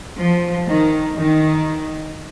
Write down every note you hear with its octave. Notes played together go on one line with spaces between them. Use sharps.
F3
D#3
D#3